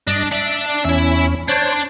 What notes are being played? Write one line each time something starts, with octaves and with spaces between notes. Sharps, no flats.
G2 D4 D#5
D4 D5 E5
E2 C#4 E4 E5
D4 C5 C#5